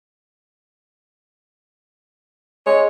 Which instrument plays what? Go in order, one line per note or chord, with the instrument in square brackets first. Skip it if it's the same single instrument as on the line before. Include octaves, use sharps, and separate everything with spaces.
[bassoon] G#3 [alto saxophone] C#5